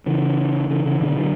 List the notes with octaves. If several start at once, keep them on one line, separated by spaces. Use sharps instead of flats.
C#3 E3
C#3 E3
C#3 E3
B2 D3
D3 F#3